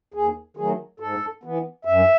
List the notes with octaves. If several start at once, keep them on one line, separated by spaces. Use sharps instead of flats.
D#2 G#4
D#3 F#3 A3 G#4
G#2 A4
E3 B3
F#2 E5